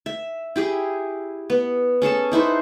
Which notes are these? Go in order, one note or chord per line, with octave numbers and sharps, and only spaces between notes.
E5
E4 G4 G#4
B3
C#4 G#4 A4 A5
D#4 E4 B4 C5